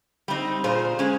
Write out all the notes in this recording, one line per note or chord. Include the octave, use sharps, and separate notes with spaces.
G3 C4 D#4
A#2 G#4 C5
G#3 C#4